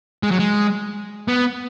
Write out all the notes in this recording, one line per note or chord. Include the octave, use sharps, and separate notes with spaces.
G#3
F#3
G#3
B3